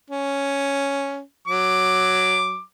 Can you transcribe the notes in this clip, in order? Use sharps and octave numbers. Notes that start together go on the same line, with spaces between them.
C#4
F#3 D6